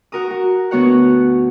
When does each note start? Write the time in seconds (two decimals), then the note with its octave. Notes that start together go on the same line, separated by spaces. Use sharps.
0.12 F#4 A#4 A#5 D#6
0.30 F#4
0.71 D2 B3 F#4 C#5 F#5 F#6